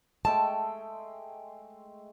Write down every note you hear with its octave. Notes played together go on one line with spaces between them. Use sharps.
G#3 A3 G5 A5